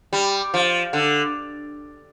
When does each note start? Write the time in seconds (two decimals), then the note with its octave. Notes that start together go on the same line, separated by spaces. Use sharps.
0.13 G3
0.54 F3
0.93 D3